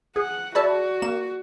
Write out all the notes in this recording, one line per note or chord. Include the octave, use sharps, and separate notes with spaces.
G#4 F#5
F#4 G#4 D5 E5 A5 B5
A#3 E7